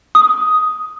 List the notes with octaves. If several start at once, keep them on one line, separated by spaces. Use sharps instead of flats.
D#6